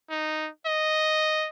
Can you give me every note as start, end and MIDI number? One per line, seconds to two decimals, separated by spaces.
0.10 0.49 63
0.66 1.49 75